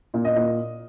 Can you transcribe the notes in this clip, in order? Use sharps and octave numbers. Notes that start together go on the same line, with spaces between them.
A#2
D#5
A#2